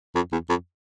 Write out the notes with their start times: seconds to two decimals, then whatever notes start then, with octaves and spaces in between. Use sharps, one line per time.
0.15 F2
0.32 E2
0.49 F2